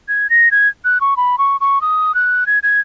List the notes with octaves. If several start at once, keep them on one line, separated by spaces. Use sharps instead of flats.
G#6
A#6
G#6
F#6
C#6
B5
C#6
C#6
D#6
F#6
G#6
G#6